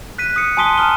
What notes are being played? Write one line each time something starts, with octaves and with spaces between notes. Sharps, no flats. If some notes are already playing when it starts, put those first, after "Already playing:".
F#6 B6 D#7
D#6 C#7
G#5 A5 C6 D#6 B6 G7
A#5 D#6 F6 G7